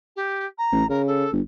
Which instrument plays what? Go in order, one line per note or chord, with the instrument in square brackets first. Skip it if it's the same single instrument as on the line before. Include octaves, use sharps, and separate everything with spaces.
[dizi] G4
A#5
[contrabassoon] A1
[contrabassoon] C#3 [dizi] A#4
[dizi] A4
[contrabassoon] G1